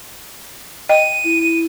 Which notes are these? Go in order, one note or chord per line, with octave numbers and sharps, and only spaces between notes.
D#5 G5 D#7
E4